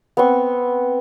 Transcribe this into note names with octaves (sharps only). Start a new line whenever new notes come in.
B3 C4 C6 C#6